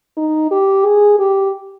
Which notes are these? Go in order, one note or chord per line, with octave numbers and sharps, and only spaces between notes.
D#4
G4
G#4
G4